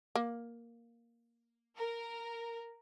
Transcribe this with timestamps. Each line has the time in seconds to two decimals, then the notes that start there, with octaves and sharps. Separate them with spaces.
0.15 A#3
1.76 A#4